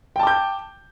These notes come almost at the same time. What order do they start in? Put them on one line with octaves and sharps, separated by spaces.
G5 A5 D6 G6